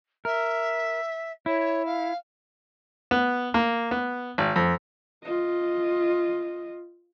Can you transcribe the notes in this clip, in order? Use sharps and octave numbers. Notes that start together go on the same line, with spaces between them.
A#4 E5
E4 C#5
F5
B3
A#3
B3
G#1
F2
F4 D#5